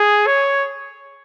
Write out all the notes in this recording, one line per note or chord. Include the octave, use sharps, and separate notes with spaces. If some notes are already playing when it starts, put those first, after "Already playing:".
Already playing: G#4
C#5